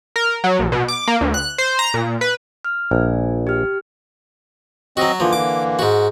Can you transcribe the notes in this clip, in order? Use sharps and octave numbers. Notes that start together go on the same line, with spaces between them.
A#4
F#3
A#1
B2
D6
A#3
D2
F#6
C5
A#5
A#2
B4
F6
A#1 G#5
G4 F6
F#3 C4 F#4 D#5
D3 E3 F3 A#3
D6
G#2 F#4